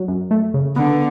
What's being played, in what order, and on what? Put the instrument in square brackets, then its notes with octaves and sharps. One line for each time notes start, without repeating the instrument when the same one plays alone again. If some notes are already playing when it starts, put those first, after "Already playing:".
Already playing: [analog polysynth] F#3
F#2
A3
C#3
[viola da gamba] D3 [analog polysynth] B3